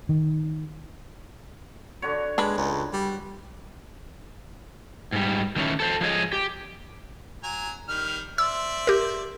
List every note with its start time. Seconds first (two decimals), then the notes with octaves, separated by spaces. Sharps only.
0.09 D#3
2.02 D3 F#4 C#5
2.38 G#3 D4 B4
2.57 C#2
2.93 G3
5.12 G#2 G3
5.56 D#3 E3 A3 C#4
5.80 A4 C5
6.01 F3 G#3 C#5 D#5
6.33 G4
7.43 F#3 G#5 A#5
7.88 D#3 G3 F6
8.38 C5 D5 E5 E6
8.87 G4 A#4